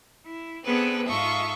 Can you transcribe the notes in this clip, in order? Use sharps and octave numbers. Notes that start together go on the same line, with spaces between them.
E4
B3 C4 D4 G#4 A4 B4
G#2 F4 A4 E5 C#6 D#6